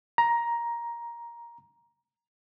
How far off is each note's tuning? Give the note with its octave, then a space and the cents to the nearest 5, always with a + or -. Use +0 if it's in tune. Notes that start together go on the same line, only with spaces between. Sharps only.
A#5 +10